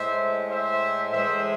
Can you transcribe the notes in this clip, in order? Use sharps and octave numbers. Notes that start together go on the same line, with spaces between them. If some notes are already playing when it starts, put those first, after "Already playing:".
Already playing: A2 G#3 C5 E5
C5 E5
A2 E3 G#3 C5 E5